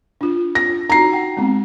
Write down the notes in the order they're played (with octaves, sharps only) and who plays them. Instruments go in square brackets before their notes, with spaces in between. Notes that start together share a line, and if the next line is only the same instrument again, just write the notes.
[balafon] D4 F4
[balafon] F4 [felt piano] A#6
[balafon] D#4 F#4 [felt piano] A#5 C7
[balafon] F#5 G5
G#3 B3 C4